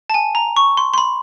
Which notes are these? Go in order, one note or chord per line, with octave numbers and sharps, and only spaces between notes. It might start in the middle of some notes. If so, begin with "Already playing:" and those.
A5
G#5
A#5
C#6
C6
C6
B5